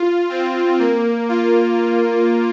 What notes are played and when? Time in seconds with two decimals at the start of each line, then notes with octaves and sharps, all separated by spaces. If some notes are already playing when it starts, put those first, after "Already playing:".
Already playing: F4
0.29 C4
0.79 A#3
1.29 F4